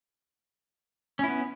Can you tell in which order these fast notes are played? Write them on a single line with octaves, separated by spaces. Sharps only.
C#4 E4 B3